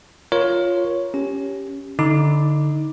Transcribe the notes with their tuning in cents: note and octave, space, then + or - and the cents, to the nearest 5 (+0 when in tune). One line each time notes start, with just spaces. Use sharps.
F4 +0 A#4 +20 C#5 +0
C#4 +10 G4 +0
D3 +0 D#4 +15 D6 +0